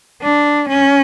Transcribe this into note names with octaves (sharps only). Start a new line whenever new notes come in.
D4
C#4